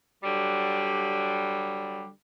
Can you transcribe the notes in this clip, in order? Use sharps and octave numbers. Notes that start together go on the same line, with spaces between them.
D3 F#3 G3